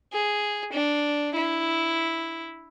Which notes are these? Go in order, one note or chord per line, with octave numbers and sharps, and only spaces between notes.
G#4
D4
E4